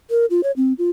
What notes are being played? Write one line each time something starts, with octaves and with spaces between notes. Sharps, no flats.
A#4
F4
C#5
C4
F4